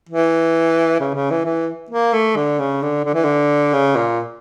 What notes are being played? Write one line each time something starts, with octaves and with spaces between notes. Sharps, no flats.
E3
C#3
C#3
E3
E3
A#3
A3
D3
C#3
D3
D3
E3
D3
C#3
A#2